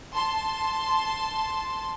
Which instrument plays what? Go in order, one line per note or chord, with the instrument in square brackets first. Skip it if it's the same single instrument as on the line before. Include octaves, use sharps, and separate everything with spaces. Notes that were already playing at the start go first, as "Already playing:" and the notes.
[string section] A5 C6